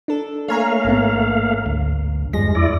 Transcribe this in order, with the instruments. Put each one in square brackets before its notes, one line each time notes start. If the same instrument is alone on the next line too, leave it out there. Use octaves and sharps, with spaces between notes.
[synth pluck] D4 A4
[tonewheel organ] A3 A#3 F5 [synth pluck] C#5 G#5 A#5
[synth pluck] A1 G#2 B3
[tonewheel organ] D2
[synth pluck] E2 F3 A#6 [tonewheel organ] G2 G#3
[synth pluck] F2 F3 [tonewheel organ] E4 D5